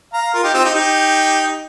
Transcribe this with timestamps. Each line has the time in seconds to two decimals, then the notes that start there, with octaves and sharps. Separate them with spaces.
0.13 F5 A#5
0.34 F4 A#4
0.44 D#4 G4
0.54 C4 F4
0.64 D#4 G4
0.75 D#4 G4